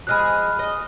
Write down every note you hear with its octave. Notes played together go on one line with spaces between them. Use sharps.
F3 G#3 G#4 B5 F6 F#6
D#5